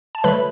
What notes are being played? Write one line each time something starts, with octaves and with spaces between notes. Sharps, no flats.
A5
D3 F#3 A3 B4 B5